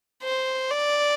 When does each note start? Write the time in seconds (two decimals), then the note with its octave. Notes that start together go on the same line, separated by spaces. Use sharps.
0.23 C5
0.70 D5